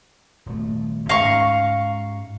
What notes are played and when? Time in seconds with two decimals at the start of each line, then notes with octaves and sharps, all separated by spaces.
0.46 D#1 A3
1.09 G#2 C#4 F5 A#5 C#6